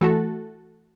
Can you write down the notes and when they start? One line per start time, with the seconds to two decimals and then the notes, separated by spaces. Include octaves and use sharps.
0.01 E3 A3 F#4 A4